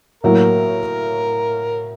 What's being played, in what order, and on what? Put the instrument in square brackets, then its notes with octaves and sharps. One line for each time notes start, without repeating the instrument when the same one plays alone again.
[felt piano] A2 F#3 A#3 [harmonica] A#4